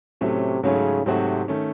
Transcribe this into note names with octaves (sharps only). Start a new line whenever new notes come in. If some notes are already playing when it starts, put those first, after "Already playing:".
A2 C3 F#3 A3 C#4
G#2 C#3 F#3 A3 C#4
G#2 C3 F#3 A3 C4 F#4
D#3 A3 C#4